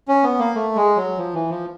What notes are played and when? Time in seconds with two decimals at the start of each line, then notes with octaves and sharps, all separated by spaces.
0.08 C#4
0.23 B3
0.39 A#3
0.55 A3
0.76 G#3
0.97 F#3
1.18 F3
1.34 E3
1.49 F3